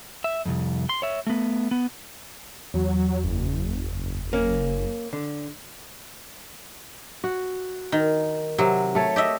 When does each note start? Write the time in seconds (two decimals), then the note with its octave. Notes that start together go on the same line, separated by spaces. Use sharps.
0.24 E5
0.45 C2 F2
0.89 C6
1.02 C#5 E5
1.27 A3 B3
1.71 B3
2.74 E2 F#3
3.24 F#1
4.33 A#3 C#4
5.13 D3
7.24 F#4
7.92 D#3
8.58 C3 F#3
8.95 A3 A4 C#5
9.16 G4 D#5 E5